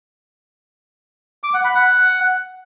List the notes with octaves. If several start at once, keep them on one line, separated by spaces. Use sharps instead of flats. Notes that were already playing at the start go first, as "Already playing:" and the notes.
D6
F#5
B5
F#5